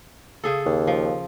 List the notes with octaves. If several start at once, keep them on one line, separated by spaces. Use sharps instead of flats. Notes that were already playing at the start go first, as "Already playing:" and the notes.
C#3 G#4 A4
D#2
F3